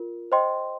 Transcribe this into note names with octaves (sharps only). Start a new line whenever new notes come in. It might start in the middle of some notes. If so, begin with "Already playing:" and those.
Already playing: F4 A#4
C5 D#5 G5 C6